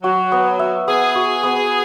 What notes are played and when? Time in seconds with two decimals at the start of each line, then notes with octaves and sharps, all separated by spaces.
0.03 F#3 F#4
0.32 B3
0.59 E5
0.88 B3 G#4
1.15 F#4
1.43 B3